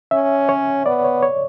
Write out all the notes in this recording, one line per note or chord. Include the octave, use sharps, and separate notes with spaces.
C#4 E5
C#5
B3 D5
C#5
C#5